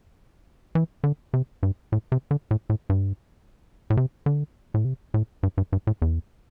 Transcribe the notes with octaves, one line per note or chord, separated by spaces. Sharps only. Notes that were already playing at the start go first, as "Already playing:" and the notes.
E3
D3
C3
G2
A2
C3
D3
A2
A2
G2
A2
C3
D3
A2
C3
A2
G2
G2
G2
A2
E2